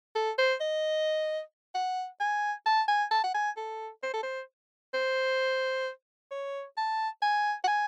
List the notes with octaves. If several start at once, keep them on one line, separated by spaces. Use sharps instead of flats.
A4
C5
D#5
F#5
G#5
A5
G#5
A5
F#5
G#5
A4
C5
A4
C5
C5
C#5
A5
G#5
F#5
G#5